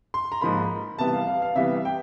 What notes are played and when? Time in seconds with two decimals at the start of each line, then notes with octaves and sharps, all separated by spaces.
0.14 C6
0.32 A#5
0.41 G#2 F3 A#3 B5
0.98 C3 E3 G3 B3 A5
1.13 F5
1.27 F5
1.42 F5
1.55 C3 E3 G3 B3 E5
1.85 G5